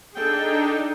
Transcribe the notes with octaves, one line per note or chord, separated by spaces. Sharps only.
D4 D#4 G#4 A4 G5